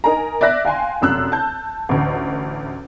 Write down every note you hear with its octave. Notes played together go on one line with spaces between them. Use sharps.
D#4 A#4 G#5 A#5
D5 E5 F#6 A#6
F5 G5 G#5 C6
F1 F#2 E6 F#6
A5 G6
A1 D2